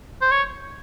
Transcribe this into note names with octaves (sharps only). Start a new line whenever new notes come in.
C5
C#5